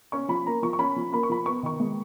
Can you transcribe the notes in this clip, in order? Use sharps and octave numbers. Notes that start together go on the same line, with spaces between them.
C#4 C#6
F3 B5
A#3 A#5
F3 C#6
C#6
C#4 B5
F3
A#3 B5
C#6
F3 B5
B3 C#6
D#3 C#6
G#3